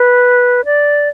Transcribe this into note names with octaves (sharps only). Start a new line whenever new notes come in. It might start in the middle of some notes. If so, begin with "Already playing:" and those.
Already playing: B4
D5